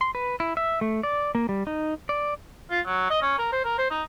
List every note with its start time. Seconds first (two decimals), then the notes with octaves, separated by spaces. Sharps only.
0.01 C6
0.15 B4
0.40 E4
0.57 E5
0.81 A3
1.03 D5
1.35 A#3
1.49 G3
1.67 D#4
2.09 D5
2.71 F4
2.86 F#3
3.10 D#5
3.22 C#4
3.38 A#4
3.52 C5
3.65 A#4
3.78 C5
3.91 D#4